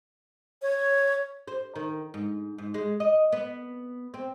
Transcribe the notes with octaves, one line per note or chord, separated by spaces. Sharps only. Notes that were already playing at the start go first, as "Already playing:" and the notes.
C#5
C5
D#3
G#2
G#2
G#3
D#5
B3
C4